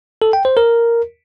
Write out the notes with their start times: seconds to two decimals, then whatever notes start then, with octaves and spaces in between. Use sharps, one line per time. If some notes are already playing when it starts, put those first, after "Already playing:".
0.22 A4
0.33 G5
0.45 C5
0.57 A#4